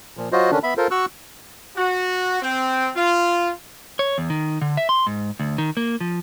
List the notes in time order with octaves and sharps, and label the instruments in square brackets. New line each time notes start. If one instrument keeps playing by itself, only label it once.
[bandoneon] A#2 F3
F#3 F4 F#4 C5 D#5
D3 D#3 C#4 D4
B3 E5 B5
F4 A4 A#4 C5
F#4 C#6 E6 F#6
[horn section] F#4
C4
F4
[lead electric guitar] C#5
E2
D#3
D3
E5
C6
G#2
D2
D#3
A#3
F3